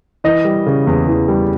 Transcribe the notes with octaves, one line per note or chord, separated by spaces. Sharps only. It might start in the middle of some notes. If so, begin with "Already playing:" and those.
E3 D#5
G3
C#3
E2
E3
G3